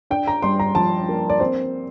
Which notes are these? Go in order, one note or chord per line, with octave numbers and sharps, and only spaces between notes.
D4 G5
A#5
G2 C6
A#5
F3 A5
A#3
D5
C4 C5